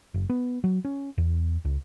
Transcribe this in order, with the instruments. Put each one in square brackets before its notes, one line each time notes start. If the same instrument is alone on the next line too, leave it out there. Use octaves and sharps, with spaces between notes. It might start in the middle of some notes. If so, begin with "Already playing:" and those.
[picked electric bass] F#1
B3
F#3
C#4
E2
C#2